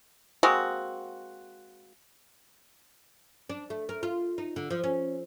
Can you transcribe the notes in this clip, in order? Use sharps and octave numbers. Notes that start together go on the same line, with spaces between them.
G#3 A#3 C4 F#4
D4
A3
A#4
F4
D#4
D3
F3
C#4